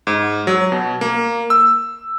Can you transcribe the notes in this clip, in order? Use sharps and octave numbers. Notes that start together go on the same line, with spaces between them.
G#2
F#3
B2
A#3
E6